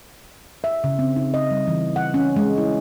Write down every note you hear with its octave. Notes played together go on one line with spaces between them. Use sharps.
E5
C#3
C4
D#4
D#5
G3
E3
F#5
C#4
G#3
E4